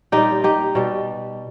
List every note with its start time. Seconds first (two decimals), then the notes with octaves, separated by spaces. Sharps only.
0.12 A#2 G3 D#4 G4
0.44 D#4 G4
0.75 B2 G3